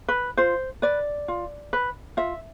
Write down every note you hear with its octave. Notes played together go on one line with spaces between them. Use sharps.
B4
F4 C5
B4 D5
F4
B4
F4 E5